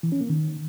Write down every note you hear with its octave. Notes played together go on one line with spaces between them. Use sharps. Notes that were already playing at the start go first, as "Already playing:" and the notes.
E3
C#4
A#3
D#3